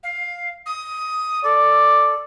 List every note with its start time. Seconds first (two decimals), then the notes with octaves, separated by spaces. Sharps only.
0.03 F5
0.66 D#6
1.44 A4 D5